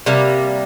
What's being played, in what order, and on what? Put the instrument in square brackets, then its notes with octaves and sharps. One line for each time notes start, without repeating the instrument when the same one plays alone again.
[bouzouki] C3 G3 A#3